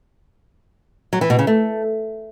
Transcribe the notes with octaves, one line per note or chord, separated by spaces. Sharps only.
F#3
E3
B2
C#3
A3